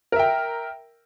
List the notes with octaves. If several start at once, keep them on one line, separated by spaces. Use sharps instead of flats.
A#4 E5 G5